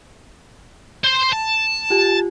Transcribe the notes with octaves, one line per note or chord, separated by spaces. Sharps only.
C5 C6
A5
F4 G4